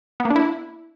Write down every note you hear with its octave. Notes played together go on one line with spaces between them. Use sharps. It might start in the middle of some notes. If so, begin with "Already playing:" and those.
B3
A#3
D4
E4